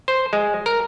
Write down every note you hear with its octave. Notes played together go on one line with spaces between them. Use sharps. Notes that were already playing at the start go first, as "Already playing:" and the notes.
C5
G#3
A#4